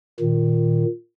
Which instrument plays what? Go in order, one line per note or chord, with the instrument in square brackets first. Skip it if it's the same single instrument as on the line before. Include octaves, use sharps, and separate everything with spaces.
[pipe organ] A#2 D#3